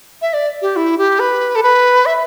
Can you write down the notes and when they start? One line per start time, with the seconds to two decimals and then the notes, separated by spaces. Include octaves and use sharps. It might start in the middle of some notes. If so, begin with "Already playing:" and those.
0.22 E5
0.33 D5
0.62 G4
0.76 E4
0.98 G4
1.19 B4
1.55 A4
1.63 B4
2.06 E5